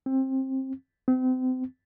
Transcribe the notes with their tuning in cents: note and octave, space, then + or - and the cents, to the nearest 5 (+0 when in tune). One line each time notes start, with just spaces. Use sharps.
C4 +20
C4 -35